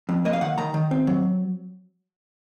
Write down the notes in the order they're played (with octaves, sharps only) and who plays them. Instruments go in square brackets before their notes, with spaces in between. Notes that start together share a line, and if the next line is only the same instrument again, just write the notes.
[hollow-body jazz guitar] F2
A#3 D#5
F5
D#3 F#5
D#3 A#5
D#3
C4
F#3